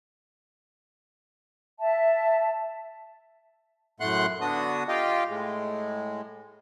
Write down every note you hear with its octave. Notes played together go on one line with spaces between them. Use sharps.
E5 A5
F#2 A2 A3 F#5 C6 F#6
D3 B3 D4 F#4 D#6
F4 G4 D#5 F5 G5
A2 G#3